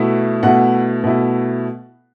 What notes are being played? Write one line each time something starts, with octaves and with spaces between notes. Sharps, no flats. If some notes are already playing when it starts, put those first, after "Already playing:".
Already playing: B2 A3 E4
B2 A3 E4 F#5
B2 A3 E4